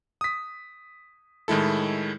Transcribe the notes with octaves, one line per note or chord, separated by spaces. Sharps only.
D#6 B6
A2 D#3 G#3 E4 A4